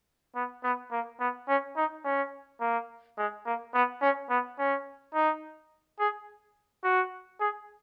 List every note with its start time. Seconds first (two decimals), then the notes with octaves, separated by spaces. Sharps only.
0.35 B3
0.64 B3
0.91 A#3
1.20 B3
1.48 C#4
1.76 D#4
2.04 C#4
2.61 A#3
3.18 G#3
3.46 A#3
3.74 B3
4.01 C#4
4.30 B3
4.59 C#4
5.14 D#4
5.99 G#4
6.84 F#4
7.40 G#4